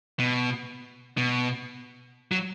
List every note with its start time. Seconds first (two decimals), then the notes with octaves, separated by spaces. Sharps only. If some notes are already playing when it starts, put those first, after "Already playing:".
0.19 B2
1.18 B2
2.32 F#3